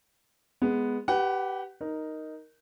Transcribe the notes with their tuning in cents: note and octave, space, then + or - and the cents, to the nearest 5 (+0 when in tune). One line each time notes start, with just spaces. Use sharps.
G#3 +0 B3 +0
G4 -10 B4 +0 F#5 +20
D#4 +0 A#4 +0